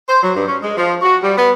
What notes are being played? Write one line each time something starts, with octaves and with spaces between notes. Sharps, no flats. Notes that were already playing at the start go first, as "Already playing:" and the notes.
C5
F#3
G2
C#4
G#3
F3
F#4
G3
B3